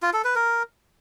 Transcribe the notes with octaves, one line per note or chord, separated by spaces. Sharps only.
F4
A4
B4
A#4